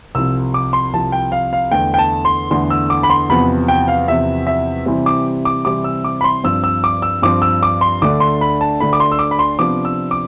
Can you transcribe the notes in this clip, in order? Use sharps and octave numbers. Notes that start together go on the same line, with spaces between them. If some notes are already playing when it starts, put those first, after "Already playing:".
C2 C3 F3 E6
D6
C6
C2 C3 F3 A5
G5
F5
F5
E2 D3 A3 G5
G5
A5
C6
E2 D3 A3 C6
E6
D6
B5
C6
E2 C3 F3 B3 B5
G5
F5
E2 C3 F3 B3 E5
E5
C3 E3 G3 C4 E4
D6
D6
C3 E3 G3 C4 E4 D6
E6
D6
B5
C6
G2 F3 C4 E6
E6
D6
E6
G2 F3 C4 D6
E6
D6
C6
D2 D3 A3 D4 D6
C6
B5
A5
D2 D3 A3 D4 B5
D6
C6
E6
D6
B5
C6
C3 F3 B3 D4 D6
E6
D6